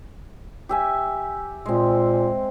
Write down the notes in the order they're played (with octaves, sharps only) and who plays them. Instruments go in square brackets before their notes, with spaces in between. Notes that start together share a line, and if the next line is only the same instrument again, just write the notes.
[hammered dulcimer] G4 E5 G#5
[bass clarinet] A#2 [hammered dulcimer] G#3 C4